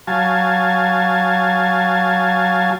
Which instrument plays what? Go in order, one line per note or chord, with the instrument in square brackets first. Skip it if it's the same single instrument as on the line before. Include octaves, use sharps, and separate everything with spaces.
[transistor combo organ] F#3 F5 G#5 A5